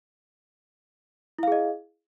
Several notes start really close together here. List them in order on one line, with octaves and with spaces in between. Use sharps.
E4 F5 G#4 D#5